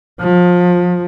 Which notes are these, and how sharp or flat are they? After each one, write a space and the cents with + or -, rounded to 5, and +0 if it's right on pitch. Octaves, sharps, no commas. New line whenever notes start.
F3 +25